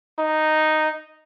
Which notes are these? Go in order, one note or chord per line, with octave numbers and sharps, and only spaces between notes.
D#4